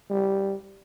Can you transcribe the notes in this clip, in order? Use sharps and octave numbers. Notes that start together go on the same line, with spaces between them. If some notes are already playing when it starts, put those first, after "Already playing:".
G3